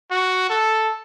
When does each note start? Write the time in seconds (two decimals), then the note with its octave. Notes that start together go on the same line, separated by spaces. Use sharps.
0.11 F#4
0.50 A4